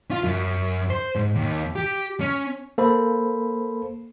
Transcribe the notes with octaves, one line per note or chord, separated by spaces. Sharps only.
F4
F#2
C5
G#2
D#2
G4
C#4
A#3 A4 C5 B5